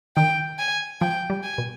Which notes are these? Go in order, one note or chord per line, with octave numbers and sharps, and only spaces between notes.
D#3 G5
G#5
F3 G5
G3
G#5
B2